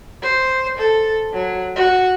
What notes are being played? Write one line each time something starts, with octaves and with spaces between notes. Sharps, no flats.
C5
A4
F#3
F#4